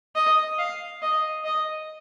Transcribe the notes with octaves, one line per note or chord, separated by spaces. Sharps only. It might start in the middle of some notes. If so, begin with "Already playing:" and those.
D#5
F5
D#5
D#5